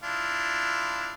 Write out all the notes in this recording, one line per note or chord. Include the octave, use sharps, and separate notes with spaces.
D4 E4 F4